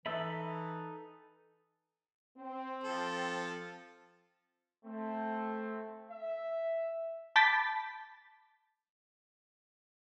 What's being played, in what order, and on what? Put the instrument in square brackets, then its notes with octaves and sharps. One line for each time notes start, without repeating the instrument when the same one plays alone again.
[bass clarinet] E3 [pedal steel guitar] D#4 A4 B5 [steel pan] E5
[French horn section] C4
[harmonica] F3 A4
[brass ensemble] A3 C4
E5
[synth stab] A5 B5 D6 G6 A6 B6